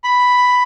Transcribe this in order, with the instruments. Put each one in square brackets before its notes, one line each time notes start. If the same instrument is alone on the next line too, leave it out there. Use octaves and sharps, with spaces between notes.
[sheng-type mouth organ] B5